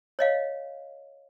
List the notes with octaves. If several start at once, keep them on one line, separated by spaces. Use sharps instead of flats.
C#5 D#5 F5